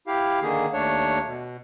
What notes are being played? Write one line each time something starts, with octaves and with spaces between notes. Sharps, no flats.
E4 G4 F5
D3 D#3 A#3 G#4
D#2 A3 D4 C#5
B2